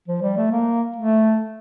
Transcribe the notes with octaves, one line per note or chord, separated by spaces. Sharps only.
F3
G3
A3
A#3
A3